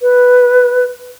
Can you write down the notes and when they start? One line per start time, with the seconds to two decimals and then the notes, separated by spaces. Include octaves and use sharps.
0.01 B4